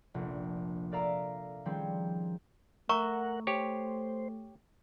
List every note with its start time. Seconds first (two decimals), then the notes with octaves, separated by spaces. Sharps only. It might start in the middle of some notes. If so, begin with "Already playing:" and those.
0.14 F1 A#1 D4
0.91 A4 A#4 D5 E5 F5 A#5
1.65 D#3 F3 G3 C4 C#4 G#4
2.89 A3 A#4 E5 F#5 A#5 C#6
3.47 G4 C5 C#5